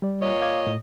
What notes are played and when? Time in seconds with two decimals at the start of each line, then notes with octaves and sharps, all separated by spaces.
0.02 G3 D5
0.21 A#2 C#5 D#5
0.42 F5 D6 G#6
0.67 A2